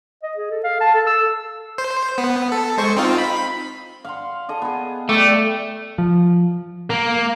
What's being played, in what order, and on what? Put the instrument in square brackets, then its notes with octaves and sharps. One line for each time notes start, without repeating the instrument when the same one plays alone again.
[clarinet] D#5
G#4
A4
F5
A5
A4
E6
[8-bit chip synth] C5
B3
A4
G#3 C5 C#6
C4 D#4 F4
B5
[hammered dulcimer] F5 F#5 C6
G#4 A4 D#5
B3 G#4
[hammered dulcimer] G3 D5 [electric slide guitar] A3
[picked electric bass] F3
[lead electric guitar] A#3